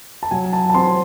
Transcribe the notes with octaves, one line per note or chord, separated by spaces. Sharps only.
A5
F#3 G#5
A5
A5
C4 C6